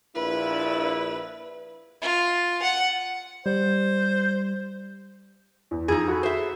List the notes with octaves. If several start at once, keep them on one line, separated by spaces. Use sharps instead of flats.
A#1 D4 E4 B4
F4
F#5
G3 C5
E2
F2 D#4 G#4
F#4 A4 B5
C5 E5